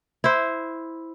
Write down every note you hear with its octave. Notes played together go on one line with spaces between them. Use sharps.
E4 C5